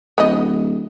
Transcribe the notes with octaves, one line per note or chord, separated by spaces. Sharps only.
D1 B3 D#4 D#5